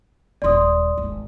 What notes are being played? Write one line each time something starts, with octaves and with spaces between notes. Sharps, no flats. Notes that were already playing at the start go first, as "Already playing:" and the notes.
D#1 F4 D5 C6 D#6
G#1